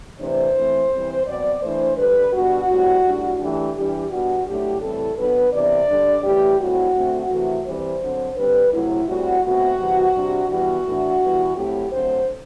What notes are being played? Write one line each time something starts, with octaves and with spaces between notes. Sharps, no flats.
C3 E3 A3 D4 C5
E3 A3 C4
E3 G3 C4
B2 F#3 C4 D5
E3 A3 D4 C5
D3 G3 D4 B4
B2 G3 D4 F#4
A2 G3 C4
A2 G3 D4
E3 A3 D4 G4
E3 G3 D4 G4
B2 G3 D4 F#4
A2 F#3 A3 D4 G4
A2 E3 G3 C4 A4
B2 F#3 B3 D4 B4
C3 E3 B3 D4 D5
D3 G3 D4
A2 E3 A3 D4 G4
A2 G3 C4 F#4
D3 A3 C4
C3 E3 A3
E3 G3 C4 C5
D3 F#3 C4
D3 G3 C4 B4
C3 F#3 A3 E4
A2 G3 C4 F#4
B2 A3 C4 F#4
C3 E3 G3
C3 G3 D4
E3 G3 B3 F#4
A2 E3 A3 D4
E3 G3 B3
A2 F#3 A3 C4 G4
D3 F#3 A3 C4 C5